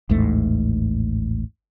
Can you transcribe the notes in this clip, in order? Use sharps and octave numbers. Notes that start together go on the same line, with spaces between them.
A1 D#2 G#2 A3